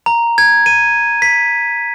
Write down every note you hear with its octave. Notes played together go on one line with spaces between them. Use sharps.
A#5
G#6
D#7
B6